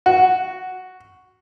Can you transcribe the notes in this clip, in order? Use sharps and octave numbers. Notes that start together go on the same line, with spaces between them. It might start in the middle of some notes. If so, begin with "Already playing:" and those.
F#4